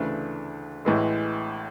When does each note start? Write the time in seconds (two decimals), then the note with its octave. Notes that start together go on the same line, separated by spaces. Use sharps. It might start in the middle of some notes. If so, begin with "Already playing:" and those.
Already playing: D2 C#3 E3 A3 D4
0.85 A1 A2 E3 G#3